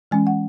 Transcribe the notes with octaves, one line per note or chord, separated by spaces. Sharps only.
E3 G#3 C#4 G#5
F#5